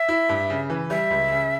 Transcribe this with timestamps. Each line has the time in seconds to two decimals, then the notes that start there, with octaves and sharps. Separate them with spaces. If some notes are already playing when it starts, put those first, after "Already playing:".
Already playing: E5
0.09 E4
0.29 G2
0.50 C#3
0.70 E3
0.90 G3 E5
1.10 C#2
1.31 C#3